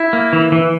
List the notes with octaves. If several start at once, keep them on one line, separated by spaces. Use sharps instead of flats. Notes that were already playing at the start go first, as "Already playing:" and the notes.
Already playing: E4
A#3
E3
E3